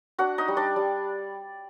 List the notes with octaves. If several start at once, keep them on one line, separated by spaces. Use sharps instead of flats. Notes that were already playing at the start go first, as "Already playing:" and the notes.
D4 F#4 F#5
D#4 D#5
G3
D4 D5
G3